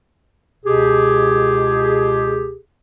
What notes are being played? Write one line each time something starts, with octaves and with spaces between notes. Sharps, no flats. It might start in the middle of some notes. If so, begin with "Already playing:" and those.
C#2 B2 G4 G#4